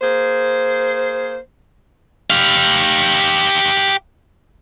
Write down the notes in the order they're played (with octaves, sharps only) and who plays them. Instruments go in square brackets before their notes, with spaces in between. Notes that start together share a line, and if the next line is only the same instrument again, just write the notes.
[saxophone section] A#3 G#4 C5
[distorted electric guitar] G4 F5